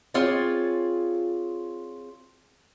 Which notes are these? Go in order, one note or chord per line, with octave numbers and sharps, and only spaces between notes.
C4 F4 G#4 C#5 D5